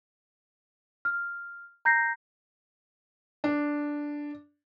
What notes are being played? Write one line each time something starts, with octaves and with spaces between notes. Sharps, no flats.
F6
A#5 G6 A#6 C7
D4